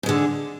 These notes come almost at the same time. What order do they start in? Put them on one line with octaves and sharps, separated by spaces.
G#2 G#3 D3